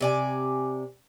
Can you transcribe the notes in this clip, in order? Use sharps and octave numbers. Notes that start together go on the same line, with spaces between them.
C3 D5 G#5